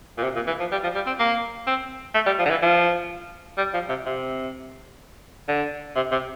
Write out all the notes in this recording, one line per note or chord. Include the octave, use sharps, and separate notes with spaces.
A#2
C3
A#2
E3
F3
G3
F3
G3
C4
A#3
C4
A3
G3
F3
D3
E3
F3
G3
F3
C3
C3
D3
C3
C3